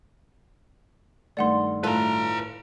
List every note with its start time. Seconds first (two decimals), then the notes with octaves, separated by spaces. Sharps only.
1.37 G2 D#3 A3 D5 F#5 C6
1.84 A2 F4 A4 B4 A#5